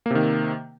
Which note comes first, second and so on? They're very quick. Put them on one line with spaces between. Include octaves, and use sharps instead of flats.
A#3 C3 D#3